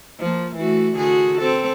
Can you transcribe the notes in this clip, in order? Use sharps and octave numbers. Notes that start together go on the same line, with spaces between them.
F3 A#3
E3 A3 F#4
D3 F#4 G#4
C4 A4